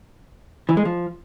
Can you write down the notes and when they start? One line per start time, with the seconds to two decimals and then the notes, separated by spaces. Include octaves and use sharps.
0.69 E3
0.77 G#3
0.85 F3